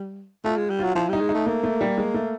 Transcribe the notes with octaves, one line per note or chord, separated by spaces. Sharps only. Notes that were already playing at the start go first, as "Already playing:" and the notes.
Already playing: G3
A3 F4
G#3
G3
F#3 F4
F3 E4
G3 D#4
G#3
D#4
A3
A3 A#3
A3
G3
G#3
A3